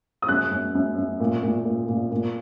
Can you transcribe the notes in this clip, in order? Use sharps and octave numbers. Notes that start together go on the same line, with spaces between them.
D#6
F#2 F#6
F#2
F#2
F#2
A#2
A#2
A#2
A#2
A#2